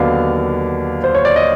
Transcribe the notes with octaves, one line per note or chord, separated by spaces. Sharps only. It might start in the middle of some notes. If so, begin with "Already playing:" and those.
Already playing: D#2 D3 F#3 B3 D4 F5
C5
C#5
D5
D#5